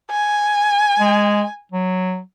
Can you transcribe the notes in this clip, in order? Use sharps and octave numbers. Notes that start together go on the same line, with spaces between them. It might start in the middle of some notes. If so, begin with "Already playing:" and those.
G#5
G#3
F#3